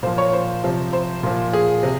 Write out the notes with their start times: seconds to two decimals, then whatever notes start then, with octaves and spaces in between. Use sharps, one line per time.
0.03 A#2 F3 C5
0.18 C#5
0.33 C5
0.63 C3 F3
0.93 C5
1.23 A#2 F3
1.53 G#4
1.83 C3